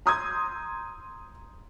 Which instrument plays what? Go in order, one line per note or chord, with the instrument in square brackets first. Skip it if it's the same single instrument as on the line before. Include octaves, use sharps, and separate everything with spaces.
[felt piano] A#5 C6 D#6 E6 G6 G#6